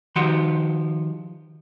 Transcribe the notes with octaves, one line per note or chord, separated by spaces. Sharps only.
D#3 F3 F#4 G4 F#5 C6